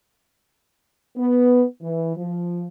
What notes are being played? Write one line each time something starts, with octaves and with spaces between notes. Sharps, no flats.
B3
E3
F3